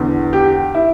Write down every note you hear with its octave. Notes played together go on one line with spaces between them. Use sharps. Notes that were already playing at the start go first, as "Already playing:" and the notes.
Already playing: E2 D3
G4
E4